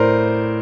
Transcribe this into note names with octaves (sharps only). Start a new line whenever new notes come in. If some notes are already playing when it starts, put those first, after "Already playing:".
Already playing: A2 A#4 C5 D5